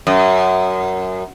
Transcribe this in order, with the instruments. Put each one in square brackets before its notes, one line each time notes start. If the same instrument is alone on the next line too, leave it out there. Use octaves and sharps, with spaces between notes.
[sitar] F#2